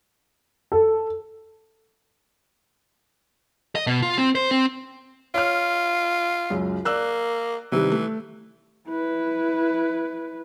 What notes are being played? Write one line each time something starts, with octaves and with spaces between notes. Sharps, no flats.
A4
D#5
B2
F4
C4
C5
C4
F4 C#5 F6
C#2 F#2
A#3 D5 E6 F#6
C3 D#3 E3 G3
A3
E4 B4